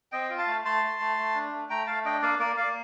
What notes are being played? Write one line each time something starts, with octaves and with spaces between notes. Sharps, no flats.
C4 D#5 G5
F4
F5 A5
A3
A3 A5 C6
A3
A3
A3
D4
A3
A3 G5 A#5
A3 F5 A5
D4 D#5 G5
A#3 D5 F5
A#3 A#4 D5
A#3 D5 F5